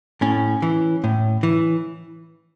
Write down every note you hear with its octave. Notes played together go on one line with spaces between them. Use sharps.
A2 C#4
E3
A2
E3